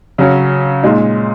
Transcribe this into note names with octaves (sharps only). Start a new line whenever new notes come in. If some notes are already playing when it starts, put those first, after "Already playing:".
C#3 F#3 C#4
A#2 G#3 D#4